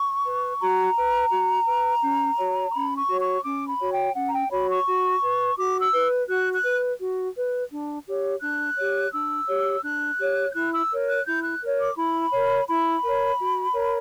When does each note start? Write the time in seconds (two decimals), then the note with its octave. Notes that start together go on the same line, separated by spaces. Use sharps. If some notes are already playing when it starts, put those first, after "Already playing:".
Already playing: C#6
0.24 B4
0.60 F#4 A#5
0.96 B4
1.32 F#4
1.66 B4
2.02 C#4
2.38 F#4 C#5
2.69 C#6
2.74 C#4 B5
2.97 C#6
3.08 F#4 C#5
3.21 C#6
3.44 C#4 D6
3.68 B5
3.79 F#4 C#5
3.91 G5
4.15 C#4 F#5
4.28 A#5
4.34 G5
4.51 F#4 C#5 B5
4.69 C#6
4.86 F#4
5.22 B4
5.58 F#4 D6
5.81 E6
5.93 B4
6.28 F#4 F#6
6.53 F#6
6.64 B4
6.99 F#4
7.36 B4
7.70 D4
8.07 G4 C#5
8.41 D4 F#6
8.77 G4 C#5
9.12 D4 E6
9.48 G4 C#5
9.83 D4 F#6
10.18 G4 C#5
10.50 G6
10.54 E4 F#6
10.73 E6
10.91 A#4 C#5
11.08 F#6
11.26 E4 G6
11.43 F#6
11.62 A#4 C#5
11.79 D6
11.96 E4 B5
12.32 A#4 C#5
12.68 E4 B5
13.03 A#4 C#5
13.39 F#4
13.74 A#4 C#5